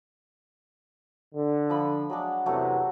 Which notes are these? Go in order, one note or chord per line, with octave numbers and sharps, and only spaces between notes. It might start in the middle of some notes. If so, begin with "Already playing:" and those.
D3
F3 B5
F#3 G#3 D4
E2 C3 F#3 A3